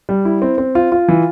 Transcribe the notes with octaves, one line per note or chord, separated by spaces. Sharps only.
G3
E4
C4
C4
F4
F4
E3